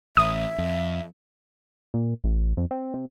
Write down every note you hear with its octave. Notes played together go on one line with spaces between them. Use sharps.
A1 E5 D#6
F2
A#2
A1
F2
C4
C3